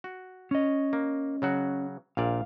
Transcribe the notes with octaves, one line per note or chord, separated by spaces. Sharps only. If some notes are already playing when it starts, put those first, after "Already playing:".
F#4
C#4 D#5
A#3
C#3 F#3 F#4
A#1 A#2 D5 F5